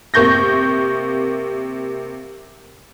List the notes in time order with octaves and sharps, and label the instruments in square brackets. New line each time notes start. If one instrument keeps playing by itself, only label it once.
[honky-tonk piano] C3 A#3 C#6 G6 A#6